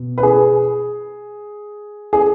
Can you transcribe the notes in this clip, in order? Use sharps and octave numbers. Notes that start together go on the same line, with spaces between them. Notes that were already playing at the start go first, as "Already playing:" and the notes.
Already playing: B2
B4
G#4
G#4